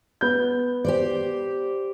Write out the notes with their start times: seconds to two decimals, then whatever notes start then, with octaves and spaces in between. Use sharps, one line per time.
0.21 B3 G6
0.85 G4 C5 D5